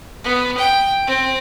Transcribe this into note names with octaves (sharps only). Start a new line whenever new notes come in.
B3
G5
C4